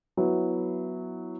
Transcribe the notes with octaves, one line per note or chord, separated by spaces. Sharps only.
F#3 B3 E4